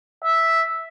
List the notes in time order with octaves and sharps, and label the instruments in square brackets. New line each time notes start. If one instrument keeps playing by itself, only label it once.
[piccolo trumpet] E5